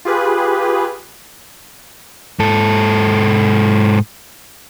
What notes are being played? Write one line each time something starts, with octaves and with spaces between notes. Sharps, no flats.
F4 G4 G#4 B4
G#2 A4